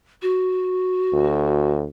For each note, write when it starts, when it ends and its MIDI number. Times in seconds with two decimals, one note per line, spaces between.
0.22 1.71 66
1.13 1.86 38